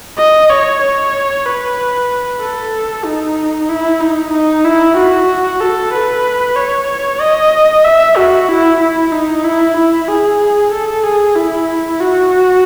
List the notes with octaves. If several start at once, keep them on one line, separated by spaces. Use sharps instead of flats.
D#5
C#5
C#5
B4
A4
D#4
E4
D#4
D#4
E4
F#4
A4
B4
C#5
D#5
E5
F#4
E4
E4
D#4
E4
E4
G#4
A4
G#4
E4
F#4